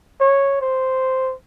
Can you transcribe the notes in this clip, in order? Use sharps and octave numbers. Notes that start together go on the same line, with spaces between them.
C#5
C5